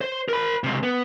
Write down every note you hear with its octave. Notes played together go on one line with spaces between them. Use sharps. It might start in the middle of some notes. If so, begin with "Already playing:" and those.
C5
A#4 B5
C#2 C3
B3